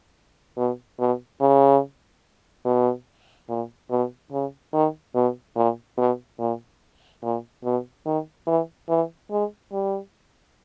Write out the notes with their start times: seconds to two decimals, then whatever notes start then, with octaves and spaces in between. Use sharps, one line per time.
0.57 B2
0.99 B2
1.40 C#3
2.65 B2
3.49 A#2
3.90 B2
4.32 C#3
4.73 D#3
5.15 B2
5.56 A#2
5.98 B2
6.39 A#2
7.23 A#2
7.64 B2
8.06 D#3
8.47 E3
8.89 E3
9.31 G#3
9.72 G3